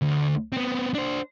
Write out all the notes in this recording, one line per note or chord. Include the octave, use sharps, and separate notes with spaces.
D2
B3 C4
D4 C5